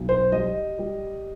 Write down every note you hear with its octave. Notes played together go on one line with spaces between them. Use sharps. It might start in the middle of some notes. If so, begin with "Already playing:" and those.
Already playing: B1
C5
G3 D#5
G3